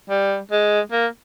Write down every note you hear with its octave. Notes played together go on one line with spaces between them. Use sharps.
G3
G#3
A#3